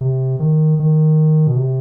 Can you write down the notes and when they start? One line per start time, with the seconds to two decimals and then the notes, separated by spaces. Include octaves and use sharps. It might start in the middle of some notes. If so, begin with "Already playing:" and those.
0.01 C3
0.39 D#3
0.80 D#3
1.47 B2
1.57 C3